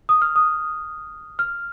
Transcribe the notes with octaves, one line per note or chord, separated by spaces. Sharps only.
D#6
F6
D#6
F6